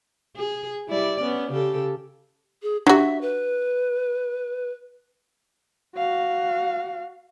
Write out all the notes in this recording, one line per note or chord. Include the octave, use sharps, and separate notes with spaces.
G#4
G3 E4 D5
B3 C#4
C#3 G4 A4
G#4
F#3 D4 F#4 G4 E5
B4
F#4 F5